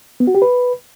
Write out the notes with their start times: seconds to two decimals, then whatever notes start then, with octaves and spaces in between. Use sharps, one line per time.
0.20 B3
0.27 F#4
0.35 G4
0.42 B4